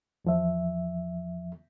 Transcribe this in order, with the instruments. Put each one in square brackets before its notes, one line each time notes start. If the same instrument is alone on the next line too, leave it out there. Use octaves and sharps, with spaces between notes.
[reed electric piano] E2 F3 E5